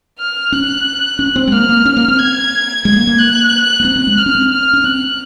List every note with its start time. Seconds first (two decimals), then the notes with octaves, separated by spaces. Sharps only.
0.20 F6
0.52 C#4 F#6
1.19 C#4 F#6
1.36 C4
1.47 G#3
1.52 A#3 F6
1.69 A#3
1.85 C#4
1.97 A#3
2.08 C4
2.19 G#6
2.85 G#3 G#6
2.96 A#3
3.07 A#3
3.18 F#6
3.80 A#3
3.85 C4 F#6
3.96 C4
4.07 G#3
4.18 C4 F6
4.26 C#4
4.35 C4
4.52 F6
4.73 C#4
4.84 C4 F#6